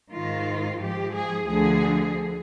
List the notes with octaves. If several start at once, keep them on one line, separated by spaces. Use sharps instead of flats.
G#2 D#3 F4
G#2 F3 G4
G#4
D2 D3 F3 G#4